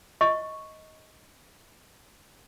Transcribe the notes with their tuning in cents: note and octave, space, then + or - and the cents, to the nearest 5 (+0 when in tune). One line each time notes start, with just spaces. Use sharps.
D#5 +15 C#6 +0